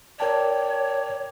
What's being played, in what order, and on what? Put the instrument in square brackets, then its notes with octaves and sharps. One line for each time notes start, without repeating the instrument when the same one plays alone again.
[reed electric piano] A#4 G5 A5 [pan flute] C#5 [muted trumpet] D5